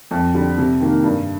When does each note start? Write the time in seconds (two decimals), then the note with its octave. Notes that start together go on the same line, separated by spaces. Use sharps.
0.11 F2
0.34 D3 G3
0.58 C3
0.80 D#3 A#3
1.04 G2